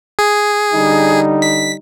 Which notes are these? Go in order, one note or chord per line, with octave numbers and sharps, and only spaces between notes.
G#4
D3 G3 D#4
B6